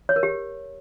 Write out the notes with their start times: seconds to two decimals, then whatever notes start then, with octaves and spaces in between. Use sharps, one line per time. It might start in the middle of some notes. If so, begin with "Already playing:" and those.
0.09 C#5
0.16 A#4
0.23 G4